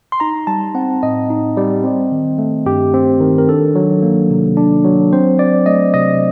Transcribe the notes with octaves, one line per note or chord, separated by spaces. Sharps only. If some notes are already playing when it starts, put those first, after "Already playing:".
C6
D#4 A#5
G3 A5
C4 F#5
A2 D#5
D#4
G3
C4
D#3
A3
G2 G4
C4
D#3
A#4
D4 A4
F#3
A#3
C3
D4
F#3
C4 C5
F#3 D5
A3 D#5
C3 D#5